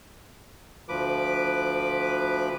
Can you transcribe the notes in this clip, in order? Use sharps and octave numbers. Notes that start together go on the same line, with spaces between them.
D2 F3 B4 D6